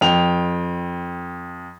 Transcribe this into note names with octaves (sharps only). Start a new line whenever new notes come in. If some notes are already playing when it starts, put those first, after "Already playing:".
F2 G5 F7